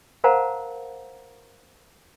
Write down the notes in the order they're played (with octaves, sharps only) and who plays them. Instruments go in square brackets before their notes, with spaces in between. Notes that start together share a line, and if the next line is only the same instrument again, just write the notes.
[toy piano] A#4 C5 F5 F#5 A5 A#5